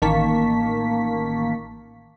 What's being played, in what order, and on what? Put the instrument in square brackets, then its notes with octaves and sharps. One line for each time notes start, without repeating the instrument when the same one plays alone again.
[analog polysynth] A1 D#3 A#3 A5 C#6 B6